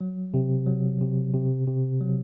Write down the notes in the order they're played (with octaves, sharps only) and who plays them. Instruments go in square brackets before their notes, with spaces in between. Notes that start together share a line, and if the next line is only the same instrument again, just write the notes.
[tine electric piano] F#3
C3
F#3
C3
C3
C3
F#3